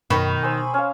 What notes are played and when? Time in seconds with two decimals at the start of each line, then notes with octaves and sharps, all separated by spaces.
0.10 F#2 B2 D#3 B5 C#6
0.43 C5 G#5 D#6 E6
0.74 C#4 F5